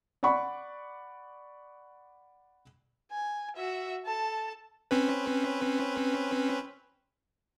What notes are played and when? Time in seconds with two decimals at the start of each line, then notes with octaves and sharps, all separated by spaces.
0.23 D5 F#5 B5 C#6
3.12 G#5
3.57 F#4 E5
4.05 A4 A5
4.91 C4 C#4 B4